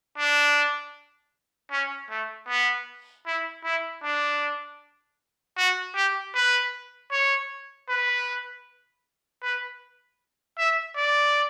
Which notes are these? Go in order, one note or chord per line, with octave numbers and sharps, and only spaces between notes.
D4
C#4
A3
B3
E4
E4
D4
F#4
G4
B4
C#5
B4
B4
E5
D5